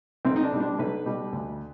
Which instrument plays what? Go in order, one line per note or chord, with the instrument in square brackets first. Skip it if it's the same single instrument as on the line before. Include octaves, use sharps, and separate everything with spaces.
[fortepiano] B1 C4
D#4
D4
B2 G3
D4
B1 B4
B2 G3
D2